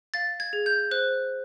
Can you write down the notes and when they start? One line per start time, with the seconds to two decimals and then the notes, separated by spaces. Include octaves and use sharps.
0.14 F5 A6
0.40 G#6
0.53 G#4
0.66 G6
0.91 C5 F#6